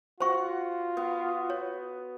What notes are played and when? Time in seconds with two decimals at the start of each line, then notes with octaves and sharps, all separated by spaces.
0.20 F4 F#4 C5 F#5 C#6
0.97 B3
1.50 C#5